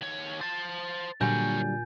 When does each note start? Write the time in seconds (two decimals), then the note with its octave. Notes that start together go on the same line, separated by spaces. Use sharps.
0.02 D#2 C#5
0.41 C5 A5 A6
1.21 A#2 D3 F#3 G3 A#4 C#5 G#5 G6